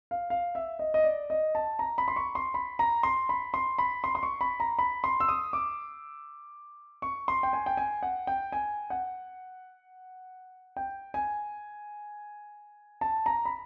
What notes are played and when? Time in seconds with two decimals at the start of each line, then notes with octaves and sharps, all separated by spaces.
0.11 F5
0.30 F5
0.55 E5
0.79 D#5
0.94 D#5
1.04 D5
1.30 D#5
1.55 A5
1.79 A#5
1.98 B5
2.08 C6
2.16 C#6
2.35 C6
2.54 B5
2.79 A#5
3.03 C6
3.29 B5
3.54 C6
3.78 B5
4.04 C6
4.15 C6
4.23 C#6
4.41 B5
4.60 A#5
4.79 B5
5.04 C6
5.20 E6
5.28 D#6
5.53 D6
7.02 C#6
7.28 C6
7.43 G5
7.53 G#5
7.66 G5
7.77 G#5
8.03 F#5
8.27 G5
8.52 G#5
8.90 F#5
10.77 G5
11.14 G#5
13.01 A5
13.26 A#5
13.45 B5